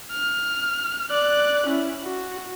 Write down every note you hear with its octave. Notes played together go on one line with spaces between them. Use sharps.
F6
D5 F#6
C#4 E4
F#4